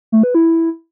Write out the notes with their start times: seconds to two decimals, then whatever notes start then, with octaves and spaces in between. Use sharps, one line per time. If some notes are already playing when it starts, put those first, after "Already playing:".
0.12 A3
0.23 B4
0.35 E4